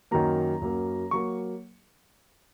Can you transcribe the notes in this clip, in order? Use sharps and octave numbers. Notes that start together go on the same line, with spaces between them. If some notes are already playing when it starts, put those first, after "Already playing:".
F#2 D#3 F#3 A#3 A#5
F#2 F#3 A#3
F#3 A#3 C#6